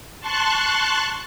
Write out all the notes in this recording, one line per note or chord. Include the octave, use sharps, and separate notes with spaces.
A5 C6 C#6 F#6